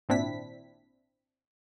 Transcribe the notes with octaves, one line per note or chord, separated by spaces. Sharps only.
G#1 A#2 C4 D4 E4 B6